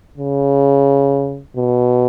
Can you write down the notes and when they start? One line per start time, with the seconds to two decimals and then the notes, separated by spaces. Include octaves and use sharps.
0.17 C#3
1.56 B2